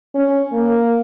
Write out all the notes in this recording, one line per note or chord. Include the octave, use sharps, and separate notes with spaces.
C#4
A#3